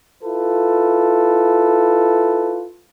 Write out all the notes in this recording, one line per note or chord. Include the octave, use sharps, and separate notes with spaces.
E4 F4 A4 B4